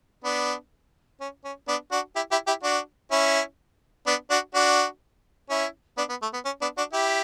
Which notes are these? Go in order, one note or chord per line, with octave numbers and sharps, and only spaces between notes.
B3 D4
C#4
C#4
B3 D4
D4 F#4
E4 G4
E4 G4
E4 G4
D4 F#4
C#4 E4
B3 D4
D4 F#4
D4 F#4
C#4 E4
B3 D4
B3
A3
B3
C#4
B3 D4
D4 F#4
E4 G4